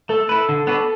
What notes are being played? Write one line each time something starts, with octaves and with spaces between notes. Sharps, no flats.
A3 A4
E4 B4
D3
B3 D4 F#4 B4